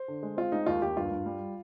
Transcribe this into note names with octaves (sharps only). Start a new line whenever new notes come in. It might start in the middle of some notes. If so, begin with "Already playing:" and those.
Already playing: C5
D3
G#3
C4 F4
G#3 D#4
D#2 F4
D#2 G4
G2 F4
G2
G3